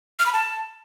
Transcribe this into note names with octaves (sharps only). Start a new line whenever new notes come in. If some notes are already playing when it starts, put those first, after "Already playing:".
F6
B5
A5